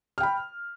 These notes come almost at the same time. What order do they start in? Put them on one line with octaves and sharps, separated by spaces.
F6 G5 B5